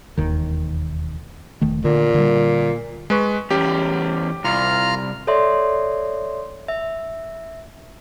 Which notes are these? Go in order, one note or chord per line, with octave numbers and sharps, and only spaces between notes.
E1 D#2 D#3
E1 D#3 A3
A#2 D3
D3 G3
G#3 B4 C#6
E2 C#4 G4
C2 F4 A#5 F6
A4 C#5 D5 E5 C6
E5